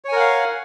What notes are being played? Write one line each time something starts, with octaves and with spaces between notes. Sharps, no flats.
A#4 C#5 F5 F#5 G#5